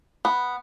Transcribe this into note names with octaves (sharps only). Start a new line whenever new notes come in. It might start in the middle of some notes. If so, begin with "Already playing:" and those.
B3